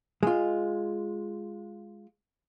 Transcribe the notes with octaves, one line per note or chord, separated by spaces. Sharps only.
G#3 F4